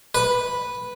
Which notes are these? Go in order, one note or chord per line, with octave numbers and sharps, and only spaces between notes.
B4